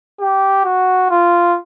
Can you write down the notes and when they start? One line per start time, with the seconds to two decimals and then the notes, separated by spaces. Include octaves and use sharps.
0.20 G4
0.64 F#4
1.10 F4